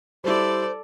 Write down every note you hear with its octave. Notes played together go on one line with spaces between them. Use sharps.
G3 E4 A4 C5 D5